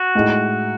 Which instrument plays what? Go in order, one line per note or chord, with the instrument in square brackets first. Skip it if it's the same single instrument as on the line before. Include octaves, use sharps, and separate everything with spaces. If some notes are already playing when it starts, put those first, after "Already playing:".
Already playing: [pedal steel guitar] F#4
[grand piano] A2 G#3 D#4